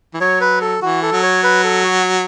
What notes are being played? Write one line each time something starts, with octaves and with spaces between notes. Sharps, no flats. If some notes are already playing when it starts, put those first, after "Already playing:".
E3
F#3 C#5
B4
A4
E3 F#4
A4
F#3
C#5
B4
A4
F#4